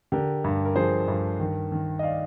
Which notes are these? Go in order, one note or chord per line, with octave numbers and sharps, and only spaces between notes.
D3 G4 A#4
G2
A#4
F3 G#4 C5
G2
D#3
D#3
D#5
D5 F5